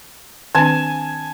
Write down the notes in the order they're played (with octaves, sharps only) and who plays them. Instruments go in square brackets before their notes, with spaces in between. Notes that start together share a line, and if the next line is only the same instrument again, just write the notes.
[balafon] D#3 C4 D4 [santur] G#5 A5